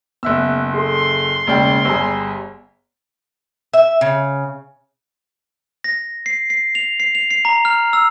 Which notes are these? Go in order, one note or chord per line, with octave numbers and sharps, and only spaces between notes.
F#1 B3 E5 E6 F#6
G#4 A4 C6
E1 C#3 A#3 D5 G5 A6
G1 G3 G#4 A#5 E6
E5
C#3
A#6
C7
C7
F7
C7
F7
C7
A#5
F6
E6